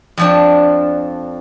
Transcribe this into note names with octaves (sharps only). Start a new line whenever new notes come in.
F2 F3 D4